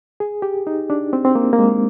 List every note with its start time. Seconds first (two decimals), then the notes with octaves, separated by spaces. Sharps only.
0.20 G#4
0.42 G4
0.67 D#4
0.90 D4
1.13 C4
1.25 C4
1.35 A#3
1.53 A#3
1.59 G#3